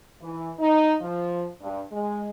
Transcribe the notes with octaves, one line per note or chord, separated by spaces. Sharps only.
E3
D#4
F3
G2
G#3